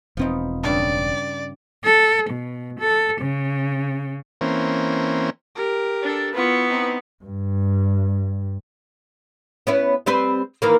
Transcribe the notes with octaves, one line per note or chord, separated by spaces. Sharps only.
E1 F3 B3 C4 D#4
G2 C#3 D5 A5
A4
B2
A4
C#3
E3 A#3 C4 C#4
G4 A#4
D4 A4
B3 E4 F4 C#6
C4 D#4
G2
B3 C#4 E4
G3 C4 B4
D#3 E3 A#3